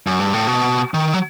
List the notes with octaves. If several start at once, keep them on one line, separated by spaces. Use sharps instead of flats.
F#2
G2
A2
B2
D#3
F#3